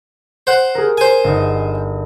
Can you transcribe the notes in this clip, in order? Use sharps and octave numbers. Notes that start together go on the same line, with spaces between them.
C5 F#5
G#4 A#4
C5 G#5
G1 D#4